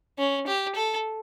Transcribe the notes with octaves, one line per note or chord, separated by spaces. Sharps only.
C#4
G4
A4